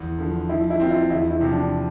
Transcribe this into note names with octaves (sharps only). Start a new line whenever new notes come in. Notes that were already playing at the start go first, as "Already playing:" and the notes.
Already playing: E2
D3 F3
F3 E4
E4
C4 F4
E4
E2 E4
E4
C3 F3
D4